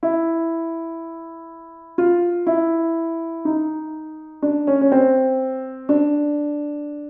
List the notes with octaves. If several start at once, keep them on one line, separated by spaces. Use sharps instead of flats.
E4
F4
E4
D#4
D4
C#4
C#4
C4
D4